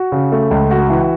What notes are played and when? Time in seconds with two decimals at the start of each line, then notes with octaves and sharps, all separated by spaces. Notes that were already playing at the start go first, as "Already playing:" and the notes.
Already playing: F#4
0.12 C#3
0.32 A3
0.51 C#2
0.71 F#4
0.90 E3